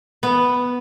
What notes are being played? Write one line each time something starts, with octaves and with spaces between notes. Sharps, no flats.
B3